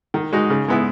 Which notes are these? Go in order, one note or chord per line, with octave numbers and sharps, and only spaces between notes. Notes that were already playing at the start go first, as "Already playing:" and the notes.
D#3
G#3 D#4 F#4
C#3
G#3 B3 E4